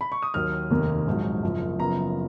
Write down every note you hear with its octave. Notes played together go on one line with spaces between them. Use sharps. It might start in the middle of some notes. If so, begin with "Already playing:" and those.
B5
C#6
D#6
D#2 D#3 F#3 F6
F1 D#2 D#3 A#3
A#1 G#2 F#3
F#1 F#2 F3
F#1 F#2 F3 B3 A#5